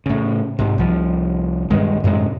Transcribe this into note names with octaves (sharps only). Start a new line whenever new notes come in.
A2 C#3
G#2 C3
C2 F3
D#1 G2 D#3 G#3
F#2 A2 C3 G#3